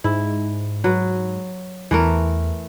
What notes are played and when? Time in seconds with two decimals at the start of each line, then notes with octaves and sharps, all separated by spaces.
0.04 G#2 E4
0.84 F#3 B4
1.91 E2 E3 A3 A#4